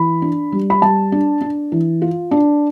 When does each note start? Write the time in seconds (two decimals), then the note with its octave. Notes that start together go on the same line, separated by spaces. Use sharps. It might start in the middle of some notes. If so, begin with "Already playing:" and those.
Already playing: E3 B5
0.22 D4
0.52 G3
0.70 B5
0.82 G3 A5
1.12 D4
1.41 D4
1.72 E3
2.02 F4
2.31 D4